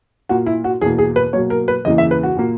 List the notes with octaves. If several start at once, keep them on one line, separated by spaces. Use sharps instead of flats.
A#2 A#3 F#4
E4
F#4
E2 B2 A#3 G#4
G#4
B4
B2 F#3 A#3 C#5
A#4
B4
E2 C#3 E3 A#3 D#5
E5
B4
F#4
A#2 A#3